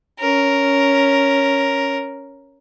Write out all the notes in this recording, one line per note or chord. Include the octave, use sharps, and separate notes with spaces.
C#4 A#4